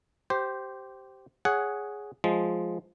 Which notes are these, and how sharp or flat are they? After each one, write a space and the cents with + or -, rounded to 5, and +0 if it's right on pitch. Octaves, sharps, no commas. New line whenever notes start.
G4 -15 C5 +0
G#4 +0 C#5 +15 F#5 +0
F3 +0 G#3 +0